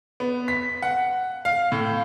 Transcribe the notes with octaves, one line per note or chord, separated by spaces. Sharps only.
B3
B6
F#5
F5
A2